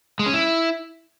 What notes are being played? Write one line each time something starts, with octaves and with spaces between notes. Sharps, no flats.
G#3
C#4
E4